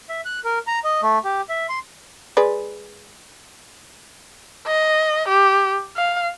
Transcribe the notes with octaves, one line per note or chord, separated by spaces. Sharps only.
E5
F#6
A#4
A#5
D#5
A3
G4
E5
C6
G#3 B4 D5
D#5
G4
F5